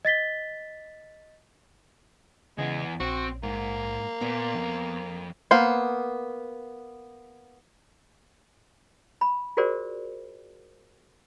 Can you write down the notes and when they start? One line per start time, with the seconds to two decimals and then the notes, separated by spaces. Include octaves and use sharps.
0.05 D#5 A6 B6 G7
2.58 E2 C#3 E3 G#3
3.00 A#1 C4 F#4
3.43 G#2 A#3
4.21 A#2 B3
4.55 F2
5.51 A#3 B3 C5
9.21 B5
9.57 F4 F#4 G#4 A#4 C5 D5